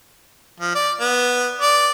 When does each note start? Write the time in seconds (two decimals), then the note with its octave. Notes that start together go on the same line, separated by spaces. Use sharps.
0.60 F3
0.75 D5
1.00 B3
1.62 D5